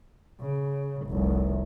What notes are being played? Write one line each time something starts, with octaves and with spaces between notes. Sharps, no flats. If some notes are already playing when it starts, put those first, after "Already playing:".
C#3
F1 C2